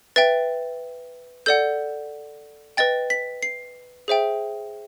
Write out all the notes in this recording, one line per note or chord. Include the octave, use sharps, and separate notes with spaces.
B4 E5 G5 A6
A4 D5 F#5 G6
B4 D#5 G5 A6
B6
C7
G#4 C5 E5 G5